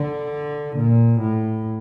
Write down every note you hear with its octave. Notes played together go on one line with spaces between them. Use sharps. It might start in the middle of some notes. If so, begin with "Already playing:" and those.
Already playing: D3
A#2
A2